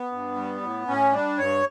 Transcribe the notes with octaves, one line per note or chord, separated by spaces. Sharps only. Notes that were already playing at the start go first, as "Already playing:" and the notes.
Already playing: B3
G2
G3
A2
A2 C#4
G3 D4
G2 C#5